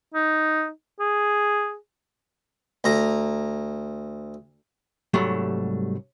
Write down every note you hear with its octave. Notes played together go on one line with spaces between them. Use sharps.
D#4
G#4
D2 A#5
C2 G#2 F#3 G3 A3